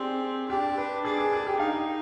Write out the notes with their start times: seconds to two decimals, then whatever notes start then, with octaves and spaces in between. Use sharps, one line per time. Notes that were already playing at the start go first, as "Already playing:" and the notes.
Already playing: C4 G4 G#4 D5
0.49 D4 G4
0.78 B4
1.04 D4 G#4
1.18 G#4
1.33 G#4
1.47 G4
1.59 D#4 F5